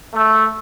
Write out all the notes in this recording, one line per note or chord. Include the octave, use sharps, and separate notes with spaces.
A3